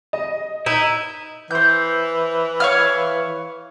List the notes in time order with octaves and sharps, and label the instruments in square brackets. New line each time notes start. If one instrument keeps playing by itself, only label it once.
[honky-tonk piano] D#5
[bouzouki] D#4 [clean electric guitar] E4
[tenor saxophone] E3 [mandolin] C5 G6
[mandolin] C#5 F5 F6